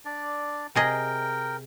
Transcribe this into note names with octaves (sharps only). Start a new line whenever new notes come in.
D4 D5
C3 G#4 A#4 D#5 G5